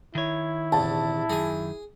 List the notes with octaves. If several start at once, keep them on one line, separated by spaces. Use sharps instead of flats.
D#3 E4 C#5
A#1 E2 C3 A5
F#2 D#3 G#4 G#5